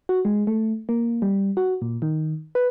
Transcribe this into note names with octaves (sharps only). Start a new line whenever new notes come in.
F#4
G#3
A3
A#3
G3
F#4
A#2
D#3
B4